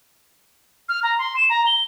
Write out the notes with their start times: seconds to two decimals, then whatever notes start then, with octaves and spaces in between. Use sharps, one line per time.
0.89 F6
1.03 A#5
1.18 C6
1.36 E7
1.49 A#5
1.66 G7